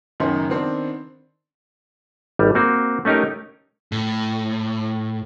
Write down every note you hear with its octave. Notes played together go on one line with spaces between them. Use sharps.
C#2 F#2 D#3 B3 C#4 C6
D#3 B3 C4 D4
G#1 G3
A#3 C4 F#4
A3 C#4 D#4 G4 A#4
A2